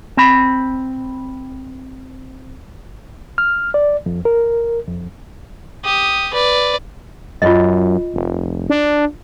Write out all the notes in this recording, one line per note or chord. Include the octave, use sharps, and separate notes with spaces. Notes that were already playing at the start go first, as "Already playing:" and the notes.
C4 B5
F6
D5
F2
A#4
F2
G4 D#6
B4 D5
F#2 F4 D#5
F1
D4